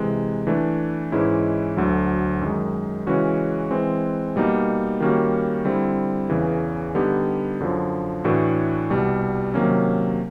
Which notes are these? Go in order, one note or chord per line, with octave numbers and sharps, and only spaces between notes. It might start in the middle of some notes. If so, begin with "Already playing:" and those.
Already playing: C3 E3 G#3
E3 A3 D4
G#2 E3 G#3 C#4 E4
D2 D3 F#3
F#2 D#3 G#3
C#3 E3 G#3 C#4 F#4
E3 G#3 C4
B2 G3 A#3 D#4
D#3 G3 A#3 C#4 F#4
D3 G3 C4 E4
E2 C#3 E3
D3 G3 B3 D#4 G4
F#2 D3 F3
A2 E3 A3 D4 F#4
C2 B2 G3
C3 D#3 F#3 A#3 C#4